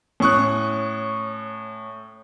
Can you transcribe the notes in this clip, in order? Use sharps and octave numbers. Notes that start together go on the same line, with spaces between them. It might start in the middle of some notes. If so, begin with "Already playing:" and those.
A2 C#4 C#6 D#6 F#6